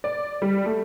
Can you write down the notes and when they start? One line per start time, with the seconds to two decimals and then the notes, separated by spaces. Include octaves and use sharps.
0.04 D5
0.42 G3
0.66 A3